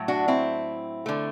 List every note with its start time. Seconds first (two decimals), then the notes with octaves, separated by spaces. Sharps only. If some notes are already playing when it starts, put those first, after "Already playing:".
Already playing: A2 F#3 A3
0.08 D4 F#4
0.28 C4 E4
1.06 D3 A3